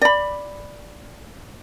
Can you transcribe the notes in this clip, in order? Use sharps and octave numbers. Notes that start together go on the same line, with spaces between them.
D5 B5